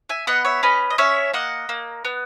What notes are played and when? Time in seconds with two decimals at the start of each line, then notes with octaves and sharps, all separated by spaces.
0.09 E5 G#5
0.27 B3 D#5 F#5
0.45 C#5 E5
0.63 C#4 B4 D#5
0.90 D#5
0.98 C#4 C#5 E5
1.34 A#3 D#5 F#5
1.69 A#3
2.05 B3